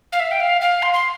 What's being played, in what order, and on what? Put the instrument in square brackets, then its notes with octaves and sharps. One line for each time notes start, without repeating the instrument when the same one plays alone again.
[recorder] F5
E5
G5
F5
F5
C6
C6